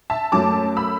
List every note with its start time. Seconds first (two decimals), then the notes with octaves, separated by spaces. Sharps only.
0.10 E5 A5
0.32 F#2 F#3 A3 A5 D6
0.77 B5 E6